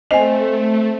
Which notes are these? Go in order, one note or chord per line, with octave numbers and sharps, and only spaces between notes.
A3 C4 D#5 G#5 C7 F7